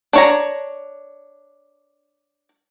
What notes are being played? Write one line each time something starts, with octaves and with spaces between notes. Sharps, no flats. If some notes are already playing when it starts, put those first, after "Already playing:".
D4 C#5 A#5